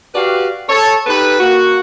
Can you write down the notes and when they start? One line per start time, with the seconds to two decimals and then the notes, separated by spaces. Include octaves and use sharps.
0.14 F#4 G4 B4 D5 F5
0.68 A4 C#5
1.07 D#4 G4 A4 B4
1.40 A#3 F#4